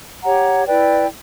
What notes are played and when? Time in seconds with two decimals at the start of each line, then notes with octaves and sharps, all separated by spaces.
0.23 G4 C#5 F#5 A#5
0.66 E4 B4 D5 G5